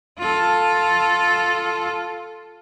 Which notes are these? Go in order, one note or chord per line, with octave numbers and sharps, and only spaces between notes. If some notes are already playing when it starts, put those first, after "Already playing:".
F4 A4